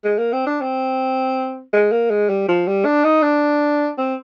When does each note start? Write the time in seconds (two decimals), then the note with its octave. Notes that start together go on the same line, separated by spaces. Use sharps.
0.04 G#3
0.18 A#3
0.33 C4
0.47 D4
0.61 C4
1.73 G#3
1.92 A#3
2.10 G#3
2.29 G3
2.48 F3
2.67 G3
2.85 D4
3.04 D#4
3.22 D4
3.98 C4